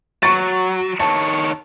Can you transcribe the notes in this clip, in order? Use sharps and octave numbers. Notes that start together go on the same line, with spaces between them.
F#3 C#6 A6
D#3 C#5 A5